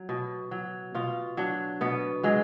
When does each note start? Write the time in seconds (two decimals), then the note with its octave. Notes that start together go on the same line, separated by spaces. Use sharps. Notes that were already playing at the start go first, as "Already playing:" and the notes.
Already playing: F#3
0.09 B2
0.51 F#3
0.95 B2 F4
1.37 F#3 D4
1.81 B2 B3
2.23 F#3 G#3